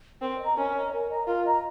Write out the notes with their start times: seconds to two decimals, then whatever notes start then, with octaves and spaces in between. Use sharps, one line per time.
0.22 C4 A#4
0.39 D#5
0.44 A#5
0.56 C#4 A#4
0.74 D#5 A#5
0.92 A#4
1.09 D#5 A#5
1.27 F4 A#4
1.44 D#5 A#5